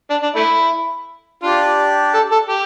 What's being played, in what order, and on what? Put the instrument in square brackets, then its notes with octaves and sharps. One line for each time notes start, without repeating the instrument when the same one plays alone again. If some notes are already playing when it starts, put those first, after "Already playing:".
[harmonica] D4
D4
A3 E4
[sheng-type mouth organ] D4 G4 D5 [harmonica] F4
[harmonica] A4
A4
G4